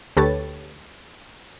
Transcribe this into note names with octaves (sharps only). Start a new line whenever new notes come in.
D2 G4 A4 B4 C#5 A6